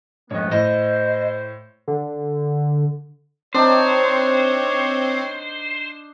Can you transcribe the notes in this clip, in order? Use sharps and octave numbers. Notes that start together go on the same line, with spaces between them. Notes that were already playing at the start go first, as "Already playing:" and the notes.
F2 G#2 A3 B3 C#5 D#5
A2 C5 D#5
D3
C4 D4 D#4 C5 C#5